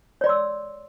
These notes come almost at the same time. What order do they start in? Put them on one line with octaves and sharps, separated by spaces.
C#5 D5 C6 E6